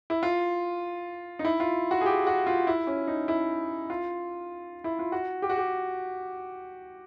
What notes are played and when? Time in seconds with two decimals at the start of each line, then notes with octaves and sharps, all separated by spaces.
0.10 E4
0.23 F4
1.39 D#4
1.45 E4
1.60 F4
1.91 F#4
2.01 G#4
2.06 G4
2.27 F#4
2.47 F4
2.67 E4
2.87 C#4
3.08 D#4
3.28 E4
3.90 F4
4.84 E4
4.99 F4
5.12 F#4
5.42 G4
5.50 F#4
5.58 G4